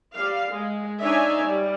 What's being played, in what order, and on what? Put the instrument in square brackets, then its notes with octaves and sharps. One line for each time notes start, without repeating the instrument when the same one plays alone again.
[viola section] G3 F5
G#3
D4 D#4 C#5 D5 E5 G#5
G3